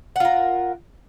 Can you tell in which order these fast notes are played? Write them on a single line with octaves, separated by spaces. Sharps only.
F#5 F4 A#4